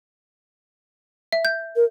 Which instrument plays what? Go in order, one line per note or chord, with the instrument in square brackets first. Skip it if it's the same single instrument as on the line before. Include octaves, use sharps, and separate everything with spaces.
[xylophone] E5
G6
[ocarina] A#4